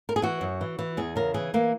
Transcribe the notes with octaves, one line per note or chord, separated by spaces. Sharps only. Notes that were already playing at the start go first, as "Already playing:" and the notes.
A#4
G#4
E3 F#4
F#2
E3
E3
E2 G#4
C#3 A#4
E3 G#4
E3 A#3